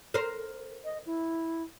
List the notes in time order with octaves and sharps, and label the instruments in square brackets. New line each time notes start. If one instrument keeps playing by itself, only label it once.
[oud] A#4 C5
[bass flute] D#5
E4